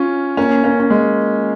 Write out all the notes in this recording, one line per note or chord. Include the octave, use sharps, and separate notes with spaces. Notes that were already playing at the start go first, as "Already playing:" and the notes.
Already playing: C#4 F4
A#3 C#4
A#3 C#4
C#4
G#3